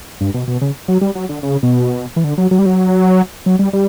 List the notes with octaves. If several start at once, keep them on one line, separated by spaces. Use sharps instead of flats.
G2
B2
B2
C#3
F#3
G3
F#3
D3
C#3
B2
E3
D3
F#3
F#3
G3
F#3
F#3
G3
G3